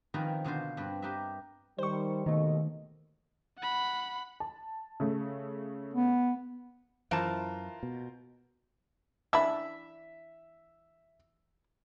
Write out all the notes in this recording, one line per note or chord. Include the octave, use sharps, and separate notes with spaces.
D#3 F3 C4 C#4 B4 A#5
B2 D3 F4 C5
G2 C4 B4
G4 A#4 B4 D#5 E5
D#3 G3 C5 C#6
D#2 B2 D#3 A3 D#5
F#5 B5
A5
C#3 A3
B3
F#2 E3 F4 A#4 C5 A5
B2
E3 D4 E5 B5 E6